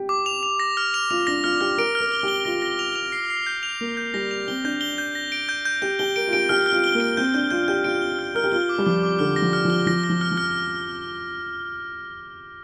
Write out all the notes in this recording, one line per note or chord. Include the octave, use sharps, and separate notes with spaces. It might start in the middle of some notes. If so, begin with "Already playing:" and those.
Already playing: G4
D6
F7
F7
A#6
F6
F7
F4 F7
D4 A#6
F4 F6
G4 F6
A#4 D7
F6
A#4
G7
G4 G7
F4 A#6
A#6
F7
F7
C7
C7
G6
F7
A#3 F7
G6
G3 A#6
F7
C4 G7
D4 G6
G7
G6
A#6
D7
G6
G6
G4 G6
G4 G7
A#4 D7
F4
G4 D7
G4 F6
F6
F4
G7
A#3
D7
C4 G6
D4 G6
F4 G6
G4 G6
F4 D7
G7
F6
A#4 F6
G4
F4 G7
D6
G3
F3 D6
D6
D3 F6
A#6
F3
F6
F3
G7
F3 A#6
A#6
F3
F6
F3
F6